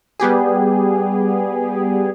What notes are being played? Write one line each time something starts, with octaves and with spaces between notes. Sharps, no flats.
G3 B3 G4 G#4